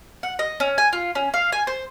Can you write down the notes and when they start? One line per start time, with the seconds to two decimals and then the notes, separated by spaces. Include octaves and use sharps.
0.23 F#5
0.39 D#5
0.60 C#4
0.78 G#5
0.93 F4
1.15 C#4
1.34 F5
1.52 G#5
1.67 C5